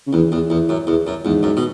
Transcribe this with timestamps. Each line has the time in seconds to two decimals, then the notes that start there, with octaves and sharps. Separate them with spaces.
0.07 C#3
0.13 E2 E3
0.32 E2
0.50 E2
0.69 F#2
0.87 E2
1.07 F#2
1.25 E2 G#2
1.43 F#2
1.57 B2